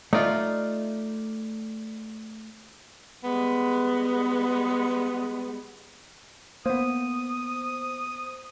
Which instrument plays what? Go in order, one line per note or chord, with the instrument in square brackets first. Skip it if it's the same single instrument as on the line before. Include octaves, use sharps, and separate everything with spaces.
[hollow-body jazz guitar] A3 D5 [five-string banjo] D#4 F4
[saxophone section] G3 G#3 B3
[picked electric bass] A#3 B3 [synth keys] C5 [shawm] D#6